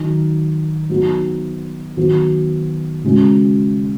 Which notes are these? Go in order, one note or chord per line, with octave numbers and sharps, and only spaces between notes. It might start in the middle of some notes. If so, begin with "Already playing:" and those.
Already playing: D#3 F#3 D#4
F#3 B3 D#4 F#4
D#3 F#3 B3 F#4
C#3 G#3 C#4 F#4